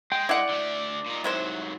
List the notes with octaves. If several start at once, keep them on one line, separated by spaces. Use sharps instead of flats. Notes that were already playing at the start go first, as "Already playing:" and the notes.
G#3 G5
E4 D5 F#5
D3 A3
A#2 D#4
G#2 C3 F#3 E4 C5